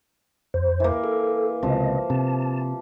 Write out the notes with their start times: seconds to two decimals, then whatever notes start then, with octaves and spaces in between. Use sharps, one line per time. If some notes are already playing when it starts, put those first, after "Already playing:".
0.54 F2 C5
0.80 E3 A#3
1.04 A4
1.63 C#2 C3 F3 D#5
2.10 C3 A5